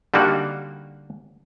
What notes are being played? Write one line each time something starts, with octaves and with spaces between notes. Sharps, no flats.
D3 G3 A#3 D#4 F#4